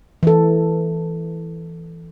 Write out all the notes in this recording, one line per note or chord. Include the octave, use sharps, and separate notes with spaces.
E3 A4